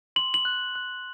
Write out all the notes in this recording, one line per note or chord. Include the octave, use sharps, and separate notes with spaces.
C6 F#7
F#7
F#6
F#6